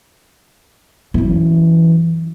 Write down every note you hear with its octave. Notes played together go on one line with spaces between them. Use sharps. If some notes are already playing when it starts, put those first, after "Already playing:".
F#2 E3